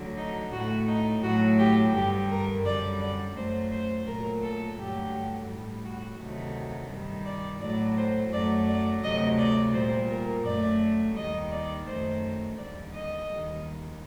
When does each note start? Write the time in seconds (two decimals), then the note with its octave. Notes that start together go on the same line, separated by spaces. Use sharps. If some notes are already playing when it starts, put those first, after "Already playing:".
Already playing: D2 D3 F#3
0.17 D#4
0.52 A2 A3 F#4
0.87 D#4
1.22 A2 F#3 A3 F#4
1.58 G4
1.93 G2 D3 G3 G4
2.29 A#4
2.65 F#2 D3 G3 D5
3.00 D5
3.36 F#2 F#3 A3 C5
3.71 C5
4.06 A#2 F#3 A3 A#4
4.42 A4
4.77 G2 D3 F#3 A3 G4
5.48 A2 G3
5.84 F#4
6.19 D2 C3 D#3 F#3 A3
6.90 G2 D#3 G3
7.25 D5
7.61 A2 F#3 A3 D5
7.96 C5
8.31 F#2 F#3 A3 D5
8.67 D5
9.03 D2 C3 F#3 A3 D#5
9.38 D5
9.73 A#2 G3 C5
10.10 A#4
10.44 F#2 F#3 A3 D5
11.16 D#2 D#3 G3 D#5
11.51 D5
11.86 F#2 D#3 A3 C5
12.57 D#2 D3 G3 D5
12.92 D#5
13.29 D#2 D#3 G3